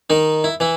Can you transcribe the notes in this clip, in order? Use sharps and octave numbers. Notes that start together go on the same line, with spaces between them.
D#3 D#4
E4
E3 E4